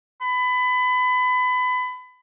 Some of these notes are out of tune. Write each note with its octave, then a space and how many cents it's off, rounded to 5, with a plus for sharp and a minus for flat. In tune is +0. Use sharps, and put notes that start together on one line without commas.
B5 +25